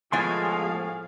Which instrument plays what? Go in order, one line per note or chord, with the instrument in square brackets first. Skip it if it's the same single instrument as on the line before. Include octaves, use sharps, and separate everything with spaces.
[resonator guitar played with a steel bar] A2 B3 G#5 [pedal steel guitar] F3 G#3 C6 [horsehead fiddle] G#4 F5